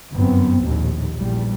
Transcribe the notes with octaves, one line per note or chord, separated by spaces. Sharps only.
G1 F#2 B3 C4
A#1 D#2 A2
A#1 E2 G3